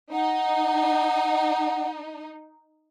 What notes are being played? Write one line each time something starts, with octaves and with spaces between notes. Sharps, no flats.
D#4 F#5